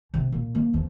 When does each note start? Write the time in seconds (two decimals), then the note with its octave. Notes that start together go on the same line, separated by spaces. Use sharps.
0.14 C3 F3
0.32 A#2
0.55 F3 A#3
0.73 E2 F3